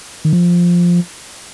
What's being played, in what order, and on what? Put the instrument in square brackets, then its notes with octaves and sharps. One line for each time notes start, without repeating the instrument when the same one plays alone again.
[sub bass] D#3
F3